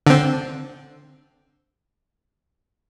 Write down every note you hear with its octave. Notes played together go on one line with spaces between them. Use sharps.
D3 C4